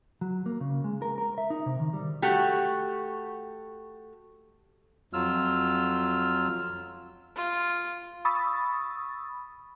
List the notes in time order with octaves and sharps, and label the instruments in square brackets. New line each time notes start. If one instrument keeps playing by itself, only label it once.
[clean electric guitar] F#3
A#3
C#3
G#3
A#4
A#4
E5
D#4
C3
D#3
G3
[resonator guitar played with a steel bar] A3 F#4 G4
[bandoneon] F2 F#3 F4 E6 F6
[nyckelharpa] F4
[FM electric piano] B5 C#6 D#6 E6 A6